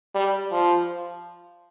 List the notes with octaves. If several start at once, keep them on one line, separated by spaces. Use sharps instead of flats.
G3
F3